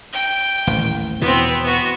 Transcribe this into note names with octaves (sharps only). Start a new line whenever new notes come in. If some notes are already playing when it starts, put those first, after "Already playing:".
G5
D#1 A1
E2 B2 E3 B3 C4
B3 F#4